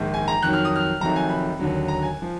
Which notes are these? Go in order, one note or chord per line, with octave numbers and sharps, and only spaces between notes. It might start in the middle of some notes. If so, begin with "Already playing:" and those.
Already playing: A#1 G#2 D#3
G#5
A#5
F2 D#3 F#3 F#6
F6
D#6
F6
F1 F2 D#3 F#3 A#5
G#5
B5
D#2 D3 F#3
A#5
G#5
F3